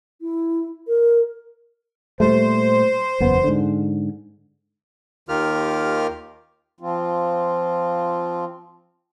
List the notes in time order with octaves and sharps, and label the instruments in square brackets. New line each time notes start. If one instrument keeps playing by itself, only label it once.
[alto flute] E4
A#4
[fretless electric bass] A#2 G3 A3 [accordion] C5
[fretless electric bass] F#1 E2 B3
G#2 D3
[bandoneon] D#2 D#3 F4 G4 A#4 F6
[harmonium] F3 C4 F4